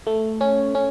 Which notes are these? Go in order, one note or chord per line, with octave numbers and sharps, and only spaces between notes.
A3
C#4
C#4